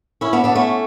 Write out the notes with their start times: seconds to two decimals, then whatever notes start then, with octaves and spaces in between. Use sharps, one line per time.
0.21 C#4 E4
0.33 B3 D4
0.44 B3 D4
0.55 A3 C#4